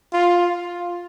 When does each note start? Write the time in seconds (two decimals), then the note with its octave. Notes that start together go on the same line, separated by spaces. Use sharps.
0.13 F4